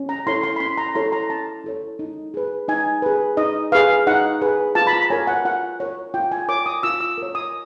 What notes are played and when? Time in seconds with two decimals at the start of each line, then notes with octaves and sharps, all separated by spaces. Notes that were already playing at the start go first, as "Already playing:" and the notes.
Already playing: C#4
0.09 A#5
0.27 E4 A4 C#5 C6
0.44 C6
0.56 B5
0.60 C#4 C6
0.78 A#5
0.95 E4 A4 C#5 C6
1.12 A#5
1.30 C#4 A5
1.64 E4 A4 C#5
1.99 D#4
2.34 G#4 B4
2.68 D#4 G#5
3.02 G#4 B4
3.37 D#4 D#5
3.72 G#4 B4 F5
4.07 D#4 F#5
4.41 G#4 B4
4.75 F4 A5
4.87 B5
4.93 A#5
5.10 A#4 C#5 G#5
5.27 F#5
5.45 F4 F#5
5.80 A#4 C#5
6.14 F4 G5
6.32 G#5
6.48 A#4 C#5 D6
6.66 D#6
6.83 F4 E6
7.01 E6
7.18 A#4 C#5
7.35 D#6